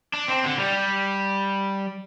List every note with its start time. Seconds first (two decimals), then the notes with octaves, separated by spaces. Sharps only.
0.14 D4
0.28 C4
0.44 D3
0.59 G3